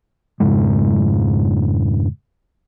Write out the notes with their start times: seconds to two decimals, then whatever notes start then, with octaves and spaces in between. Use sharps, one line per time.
0.40 F2 G#2 C#3 G#3